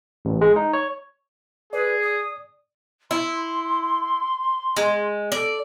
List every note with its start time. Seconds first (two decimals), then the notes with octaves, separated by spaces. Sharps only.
0.25 A1
0.41 G#3
0.56 D#4
0.73 C#5
1.73 G#4 B4 D5
2.02 D#6
3.11 E4 C6
4.77 G#3
5.32 A4 D5